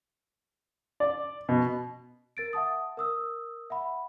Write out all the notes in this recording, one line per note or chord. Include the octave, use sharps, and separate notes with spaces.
D5
B2
A#4 A6 D7
E5 F#5 A5 D#6
A#4 D#6 E6
E5 F#5 B5